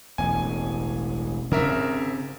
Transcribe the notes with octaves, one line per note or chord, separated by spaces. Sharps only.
E1 A1 G#5
G#1 C#3 C4 A#4 E5